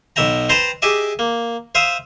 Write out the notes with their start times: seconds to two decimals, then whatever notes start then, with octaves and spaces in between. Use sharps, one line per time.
0.16 B1 B2 E5 G5 A#5
0.49 B4 C5 G5 A5 A#5 C6
0.82 G4 G#4 D#5 E5 D6
1.19 A#3
1.75 C5 E5 F5 D#6